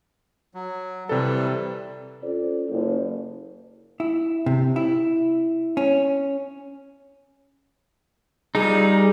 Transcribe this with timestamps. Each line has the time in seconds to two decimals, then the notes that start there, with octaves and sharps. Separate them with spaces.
0.54 F#3
1.09 C3 E3 G3 A4
2.23 C#4 F4 A4 C5 D5
2.69 F#1
4.00 E4
4.46 C3
4.76 E4
5.77 C#4
8.55 A#2 G3 D#4 G#4